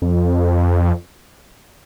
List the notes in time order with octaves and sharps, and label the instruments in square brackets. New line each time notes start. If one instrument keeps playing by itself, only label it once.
[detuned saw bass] F2